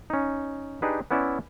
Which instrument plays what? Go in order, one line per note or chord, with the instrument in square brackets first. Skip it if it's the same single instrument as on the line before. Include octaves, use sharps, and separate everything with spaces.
[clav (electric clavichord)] C#4 D#4
D4 D#4 G4 G#4 B4
B3 C#4 E4 D5 E5